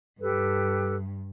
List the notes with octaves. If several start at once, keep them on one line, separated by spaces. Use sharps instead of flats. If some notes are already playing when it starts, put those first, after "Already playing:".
G2 G4 A4 B4